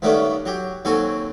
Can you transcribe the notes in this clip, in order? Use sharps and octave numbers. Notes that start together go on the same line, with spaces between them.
G2 D#3 A3 B3 C#4 D4
F#3 G4
D#2 F#3 C4 A4 G#5 C#6